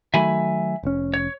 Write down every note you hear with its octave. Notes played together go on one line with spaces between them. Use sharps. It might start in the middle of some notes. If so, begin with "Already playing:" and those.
D#3 F#3 A3 E5 G#5 B5
F1 C#4
C#5